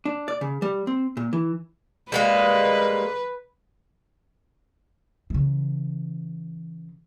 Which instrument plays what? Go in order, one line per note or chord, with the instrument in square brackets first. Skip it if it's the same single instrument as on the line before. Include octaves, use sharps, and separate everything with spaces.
[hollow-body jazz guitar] D4
D5
C#3
G3
C4
A#2
E3
[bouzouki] G3 G#3 A#3 [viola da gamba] B4
[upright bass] C#3 E3